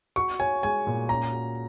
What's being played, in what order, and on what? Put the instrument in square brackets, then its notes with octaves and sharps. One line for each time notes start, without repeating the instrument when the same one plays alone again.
[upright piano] F#4 [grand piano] C#6
[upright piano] C#5 [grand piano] G#5
[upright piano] G#3 [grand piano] G#5
[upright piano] A#2
[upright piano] C#4 [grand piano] A#5
[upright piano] F#4